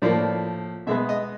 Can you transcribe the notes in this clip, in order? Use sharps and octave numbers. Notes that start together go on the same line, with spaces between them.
A2 F3 A#3 D5
B2 G#3 B3 E5
D#5